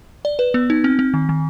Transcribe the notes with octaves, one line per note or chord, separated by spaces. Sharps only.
D5
B4
B3
D#4
C4
C4
D#3
D#3